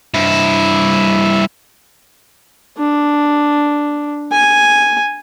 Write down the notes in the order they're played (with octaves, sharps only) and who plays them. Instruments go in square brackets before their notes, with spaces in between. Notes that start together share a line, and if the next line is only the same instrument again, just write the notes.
[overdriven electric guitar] G2 E4
[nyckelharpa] D4
G#5